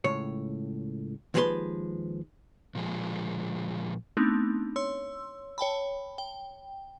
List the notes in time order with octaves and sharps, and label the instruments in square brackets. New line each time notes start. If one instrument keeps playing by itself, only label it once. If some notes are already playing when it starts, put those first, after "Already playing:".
[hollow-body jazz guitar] C#2 A2 C#5
D#2 F3 G#3 G#4 B4 C6
[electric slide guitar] A#2 F3 G#3
[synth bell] A3 B3 C4 D4 D#4
C#5 C6 E6
C#5 G5 A5 B5
G5